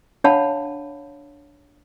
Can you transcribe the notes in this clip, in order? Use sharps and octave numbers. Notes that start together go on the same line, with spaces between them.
D4 C#5 F5 F#5 A5 B5